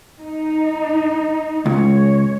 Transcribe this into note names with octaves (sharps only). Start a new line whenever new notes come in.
D#4
C#2 G#3 C#5